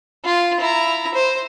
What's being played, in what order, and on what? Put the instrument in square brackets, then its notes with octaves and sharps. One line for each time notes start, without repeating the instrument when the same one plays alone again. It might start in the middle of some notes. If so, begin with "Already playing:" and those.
[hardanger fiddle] F4
E4 A#5
C5